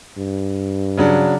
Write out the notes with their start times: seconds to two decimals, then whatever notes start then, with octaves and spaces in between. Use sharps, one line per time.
0.17 G2
0.98 C#3 F#3 D4